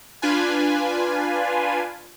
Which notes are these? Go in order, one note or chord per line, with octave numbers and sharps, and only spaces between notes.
D4 F4 B4 G#5